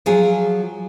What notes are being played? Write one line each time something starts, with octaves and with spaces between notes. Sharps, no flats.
F3 F#3 G#4